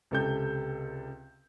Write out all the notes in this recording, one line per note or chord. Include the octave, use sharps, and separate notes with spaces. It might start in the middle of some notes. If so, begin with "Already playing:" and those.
C#2 C3 A4 G5 G6